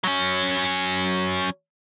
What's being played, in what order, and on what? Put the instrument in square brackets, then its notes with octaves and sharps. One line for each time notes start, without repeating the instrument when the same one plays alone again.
[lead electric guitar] F#3 C#4